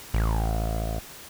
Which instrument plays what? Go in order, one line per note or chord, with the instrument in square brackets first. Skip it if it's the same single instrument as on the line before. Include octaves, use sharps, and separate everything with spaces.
[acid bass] A1